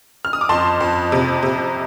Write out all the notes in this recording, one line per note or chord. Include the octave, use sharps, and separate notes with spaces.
F6
D#6
D6
F2 A5 C6
F2
C3
C3